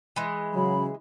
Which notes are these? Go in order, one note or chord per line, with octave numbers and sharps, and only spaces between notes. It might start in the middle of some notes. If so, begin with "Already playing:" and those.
E3 G#3
C#3 F#3 B5